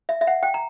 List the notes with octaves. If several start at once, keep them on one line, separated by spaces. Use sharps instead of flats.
E5
E5
F#5
G5
A#5